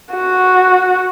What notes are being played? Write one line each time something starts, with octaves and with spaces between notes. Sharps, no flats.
F#4